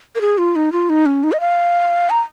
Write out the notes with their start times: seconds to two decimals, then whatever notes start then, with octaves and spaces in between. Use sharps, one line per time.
0.16 A#4
0.21 G#4
0.38 F4
0.56 D#4
0.72 F4
0.90 D#4
1.06 C#4
1.24 D#4
1.32 D#5
1.40 F5
2.10 A#5